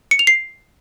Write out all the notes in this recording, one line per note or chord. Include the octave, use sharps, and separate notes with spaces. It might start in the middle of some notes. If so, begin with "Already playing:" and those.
C#7
F7
C7